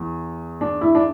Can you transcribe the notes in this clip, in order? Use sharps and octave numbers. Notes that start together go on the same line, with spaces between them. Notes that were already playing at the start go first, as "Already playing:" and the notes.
Already playing: E2
D4
E4
D4